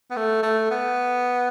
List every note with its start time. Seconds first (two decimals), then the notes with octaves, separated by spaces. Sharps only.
0.11 B3
0.17 A3
0.43 A3
0.71 B3